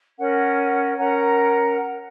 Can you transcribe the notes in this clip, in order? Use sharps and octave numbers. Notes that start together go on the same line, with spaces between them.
C#4 A#4 F#5
C#4 A#4 F#5 A#5